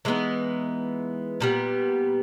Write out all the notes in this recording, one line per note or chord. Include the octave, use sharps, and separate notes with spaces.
E3 G#3 B3 D#4
A#2 G3 B3